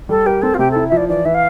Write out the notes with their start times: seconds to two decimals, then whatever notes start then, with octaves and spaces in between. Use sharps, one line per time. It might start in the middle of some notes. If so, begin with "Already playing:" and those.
0.09 G3 A4
0.26 G4 A#4
0.42 C4 A4
0.54 F4
0.59 C3 G4
0.71 E4 A4
0.89 E5
0.92 F3 D5
1.09 E3 D5
1.25 E3 E5
1.34 F5